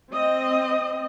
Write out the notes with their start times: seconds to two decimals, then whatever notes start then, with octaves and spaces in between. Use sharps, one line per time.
0.12 C4 D#5